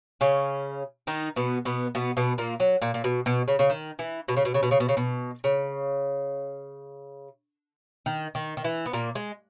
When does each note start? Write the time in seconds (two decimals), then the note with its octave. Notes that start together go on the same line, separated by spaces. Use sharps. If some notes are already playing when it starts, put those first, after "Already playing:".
0.21 C#3 C#4
1.07 D#3 D#4
1.36 B2 B3
1.65 B2 B3
1.95 B2 B3
2.17 B2 B3
2.38 A#2 A#3
2.60 F#3
2.82 A#2
2.94 A#2
3.04 B2
3.26 B2
3.48 C#3
3.59 C#3
3.70 D#3
3.99 E3
4.28 B2
4.37 C#3
4.45 B2
4.54 C#3
4.63 B2
4.71 C#3
4.80 B2
4.89 C#3
4.97 B2
5.44 C#3
8.06 D#3
8.35 D#3
8.57 D#3
8.64 E3
8.86 B3
8.93 A#2 A#3
9.15 G#3